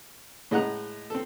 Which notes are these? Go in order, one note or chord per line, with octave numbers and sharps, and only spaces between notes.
A2 G#3 D#5 F#5 A#5 F#6
C4 A4